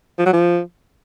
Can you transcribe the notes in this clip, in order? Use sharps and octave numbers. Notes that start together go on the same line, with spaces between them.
F3
F#3
F3